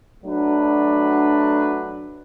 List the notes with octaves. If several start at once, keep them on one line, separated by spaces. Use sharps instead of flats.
F#3 A3 D4 F#4 B4